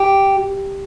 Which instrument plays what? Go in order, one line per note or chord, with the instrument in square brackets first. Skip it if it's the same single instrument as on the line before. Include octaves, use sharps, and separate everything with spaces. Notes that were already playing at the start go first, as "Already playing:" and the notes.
Already playing: [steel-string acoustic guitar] G4